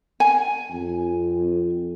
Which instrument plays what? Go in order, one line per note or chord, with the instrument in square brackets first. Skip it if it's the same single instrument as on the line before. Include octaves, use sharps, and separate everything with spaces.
[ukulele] G#5
[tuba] F2